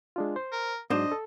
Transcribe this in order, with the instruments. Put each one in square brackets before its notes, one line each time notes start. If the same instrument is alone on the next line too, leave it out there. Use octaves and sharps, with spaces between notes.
[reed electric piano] G#3 D4 F4
C5
[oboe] A#4
[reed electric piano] G#2 F#3 [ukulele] D4 C5 [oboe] D#5
[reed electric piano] A4